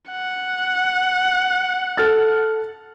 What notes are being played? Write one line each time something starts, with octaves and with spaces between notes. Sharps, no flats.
F#5
A4 F6 A6